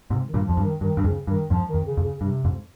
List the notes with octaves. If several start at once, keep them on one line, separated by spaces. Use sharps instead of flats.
G#2 C3
D#3
G2 A#2
F2 F3
G2
D#3
G2 D#3
G2
F2 C#3
G2 D#3
F2 G#2 F3
D#3
F2
C#3
F2
C#3
G2 C3
F2 G#2